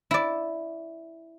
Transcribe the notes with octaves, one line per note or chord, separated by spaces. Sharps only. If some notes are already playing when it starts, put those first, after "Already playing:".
E4 D5